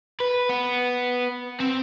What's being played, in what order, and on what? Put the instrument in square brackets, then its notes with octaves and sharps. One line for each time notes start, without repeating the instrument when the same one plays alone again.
[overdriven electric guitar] B4
B3
C4